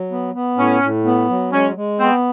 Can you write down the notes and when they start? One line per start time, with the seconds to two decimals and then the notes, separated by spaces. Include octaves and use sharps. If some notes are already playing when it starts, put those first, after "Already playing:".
Already playing: F#3
0.11 B3
0.34 B3
0.57 A2 C#4
0.82 A2
1.05 B3
1.29 F#3
1.52 G#3 C#4
1.76 G#3
2.00 B3 C4